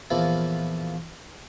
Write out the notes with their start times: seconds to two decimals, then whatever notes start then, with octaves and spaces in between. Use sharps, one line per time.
0.10 E2 A#2 F3 E4